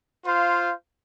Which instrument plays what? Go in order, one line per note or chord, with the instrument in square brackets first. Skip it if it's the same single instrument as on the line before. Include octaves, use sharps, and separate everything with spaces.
[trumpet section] F4 C5 F5